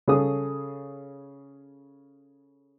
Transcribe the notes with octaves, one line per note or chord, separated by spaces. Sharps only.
C#3 G#4 A4 D#6